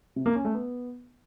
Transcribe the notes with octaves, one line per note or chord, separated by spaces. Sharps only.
C3
A#3
C#4
A3
B3